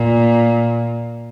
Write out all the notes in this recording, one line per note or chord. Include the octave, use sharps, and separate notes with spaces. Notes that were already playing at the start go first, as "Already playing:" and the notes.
Already playing: A#2